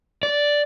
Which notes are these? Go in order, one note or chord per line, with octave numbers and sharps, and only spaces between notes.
D5